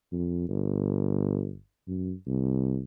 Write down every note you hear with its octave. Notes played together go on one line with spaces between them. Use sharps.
F2
G1
F#2
C2